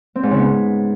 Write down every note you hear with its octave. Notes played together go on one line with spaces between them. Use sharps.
C4
G#2
C#3
B3